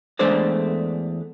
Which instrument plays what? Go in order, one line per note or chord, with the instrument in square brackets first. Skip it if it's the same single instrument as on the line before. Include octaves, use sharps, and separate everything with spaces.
[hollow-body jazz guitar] E2 G#3 A3 D4 C5 D5